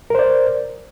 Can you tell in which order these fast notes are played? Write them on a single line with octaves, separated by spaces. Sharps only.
A#4 C5 D5